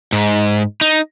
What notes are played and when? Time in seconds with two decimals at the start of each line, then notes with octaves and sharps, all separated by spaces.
0.12 G#2
0.81 D#4